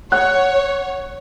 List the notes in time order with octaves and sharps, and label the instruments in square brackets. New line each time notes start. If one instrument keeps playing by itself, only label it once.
[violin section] C#5 [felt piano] F#5 F#6